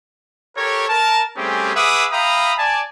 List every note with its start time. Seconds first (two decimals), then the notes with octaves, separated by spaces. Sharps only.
0.56 G4 A4 A#4 C#5
0.89 A#4 A5
1.36 G3 A3 C4 C#4 G4 G#4
1.74 G#4 B4 E5 F#5 D6 D#6
2.12 E5 F5 G5 A#5 B5 D#6
2.58 D5 G#5 A5